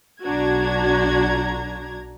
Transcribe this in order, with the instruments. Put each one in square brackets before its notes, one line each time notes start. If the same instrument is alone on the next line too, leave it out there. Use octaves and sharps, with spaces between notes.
[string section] B1 A#5 G#6 [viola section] D4 F#4